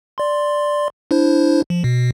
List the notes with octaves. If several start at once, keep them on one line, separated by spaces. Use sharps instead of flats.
D5 C6
D4 E4 C5
F3
B2